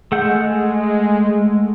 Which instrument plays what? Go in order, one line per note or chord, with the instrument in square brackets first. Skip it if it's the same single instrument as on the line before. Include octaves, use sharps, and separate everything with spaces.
[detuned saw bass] G#3 [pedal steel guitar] A3 F#5 G6